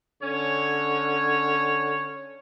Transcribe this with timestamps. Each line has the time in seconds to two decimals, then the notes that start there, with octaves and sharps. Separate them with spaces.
0.21 D3 C#4 C#5